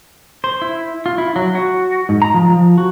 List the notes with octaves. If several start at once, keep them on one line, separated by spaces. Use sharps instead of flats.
C5
E4
F4
E4
F#3
F#4
G#2
A#5
F3
F3
F#4